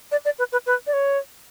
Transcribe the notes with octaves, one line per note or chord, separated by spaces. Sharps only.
D5
D5
B4
B4
B4
D5
C#5